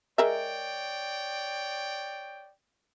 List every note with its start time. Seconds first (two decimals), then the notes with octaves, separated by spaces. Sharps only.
0.18 G#3 A#4 C#5 D5 E5 G5